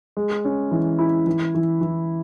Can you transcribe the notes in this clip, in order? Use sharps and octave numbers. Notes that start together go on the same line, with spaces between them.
G#3
C#4
E3
E4
E3
E3
E3